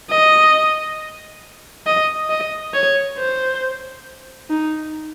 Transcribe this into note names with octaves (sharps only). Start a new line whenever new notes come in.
D#5
D#5
D#5
C#5
C5
D#4